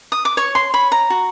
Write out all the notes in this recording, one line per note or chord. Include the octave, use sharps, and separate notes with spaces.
D#6
D6
C#5 C#6
C6
C#5 B5
A#5
F#4